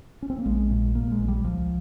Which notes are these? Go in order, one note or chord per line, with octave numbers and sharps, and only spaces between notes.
C#4
C4
A#3
A#1 G#3
A#2
A#2 A#3
G#3
A#1
G3
C#2 F3